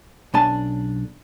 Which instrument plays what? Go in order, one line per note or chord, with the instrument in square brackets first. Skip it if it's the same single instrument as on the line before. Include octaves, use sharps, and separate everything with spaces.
[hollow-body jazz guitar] B1 C#4 D4 G#5 A5